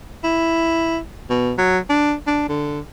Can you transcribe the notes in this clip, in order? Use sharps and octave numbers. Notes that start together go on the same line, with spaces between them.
E4
B2
F#3
D4
D4
D3